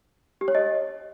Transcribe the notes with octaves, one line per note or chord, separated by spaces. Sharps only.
G4
C#5
D#5